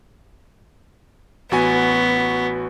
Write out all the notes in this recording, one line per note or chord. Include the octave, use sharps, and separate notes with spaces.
A1 B3 F#4 G#5